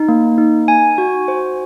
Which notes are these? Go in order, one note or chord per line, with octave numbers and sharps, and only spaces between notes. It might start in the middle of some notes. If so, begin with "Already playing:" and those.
Already playing: D#4
A#3
D#4
G#5
F#4
C5